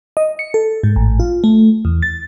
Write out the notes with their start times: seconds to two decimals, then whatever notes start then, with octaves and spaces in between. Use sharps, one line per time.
0.17 D#5
0.39 C#7
0.54 A4
0.83 G#2
0.96 A1
1.20 F4
1.44 A3
1.85 E2
2.02 A6